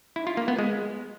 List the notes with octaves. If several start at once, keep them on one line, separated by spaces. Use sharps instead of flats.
E4
F4
A#3
B3
G#3